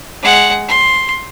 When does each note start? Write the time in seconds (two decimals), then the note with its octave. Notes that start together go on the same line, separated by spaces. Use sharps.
0.23 G#3 F#5
0.68 C6